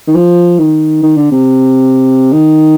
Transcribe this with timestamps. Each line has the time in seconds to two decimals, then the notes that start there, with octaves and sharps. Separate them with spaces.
0.07 D#3
0.15 F3
0.59 D#3
1.03 D#3
1.17 D3
1.32 C3
2.33 D#3